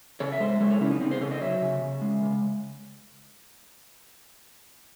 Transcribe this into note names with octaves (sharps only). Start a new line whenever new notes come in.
C#3 A4 C#5
E5
G#3 C5 D#5
G#3 A4 C#5
A4 C#5
C#3 C#4 E4
C4 D#4
C#3 C4 D#4
G#4 C5
C#3 A4 C#5
C5 D#5
F#3 C#5 E5
C#3
C#3
G#3
C#3